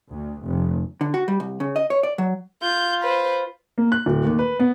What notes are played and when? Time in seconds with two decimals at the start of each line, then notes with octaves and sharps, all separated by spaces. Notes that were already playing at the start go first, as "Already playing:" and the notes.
0.10 D2
0.45 F1
1.01 D3
1.14 F#4
1.28 G3
1.40 C2
1.60 C#3
1.76 D#5
1.90 C#5
2.03 D5
2.18 F#3
2.62 F4 G6
3.03 B4 C5
3.78 A#3
3.92 F#6
4.06 D1
4.25 D#2
4.39 B4
4.60 B3